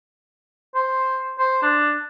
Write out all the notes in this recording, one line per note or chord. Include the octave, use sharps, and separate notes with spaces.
C5
C5
D4